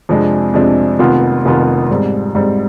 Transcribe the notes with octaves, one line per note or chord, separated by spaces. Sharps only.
F2 C3 F3 G#3 D4
F2 C3 F3 G#3 D4
F1 F2 D#3 B3 F4
F1 F2 D#3 B3 F4
G#2 G3 C4
G#2 G3 C4